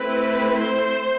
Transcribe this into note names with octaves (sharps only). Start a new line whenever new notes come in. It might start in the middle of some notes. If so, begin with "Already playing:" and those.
Already playing: A3 C4 E4 B4
C5